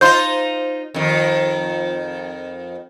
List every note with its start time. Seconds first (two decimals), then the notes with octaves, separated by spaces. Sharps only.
0.01 D#4 F4 C5 C6 G6
0.94 F2 D#3